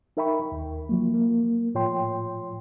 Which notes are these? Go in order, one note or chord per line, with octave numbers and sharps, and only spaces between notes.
D#4 A#4 E5 G5 B5 C#6
D#2
F3 F#3 A#3
A#3
A2 F3 F4 C#5 G5 C6